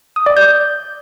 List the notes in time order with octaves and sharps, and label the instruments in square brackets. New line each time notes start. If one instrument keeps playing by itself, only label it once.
[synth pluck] D#6
D5
G6